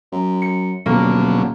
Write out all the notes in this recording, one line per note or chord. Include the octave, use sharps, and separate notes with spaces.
F#2
C#7
D#1 B2 D3 F#3 A#3